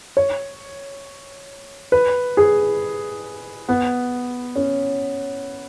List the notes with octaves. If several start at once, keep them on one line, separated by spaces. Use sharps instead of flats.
C#5
B4
G#4
B3
C#4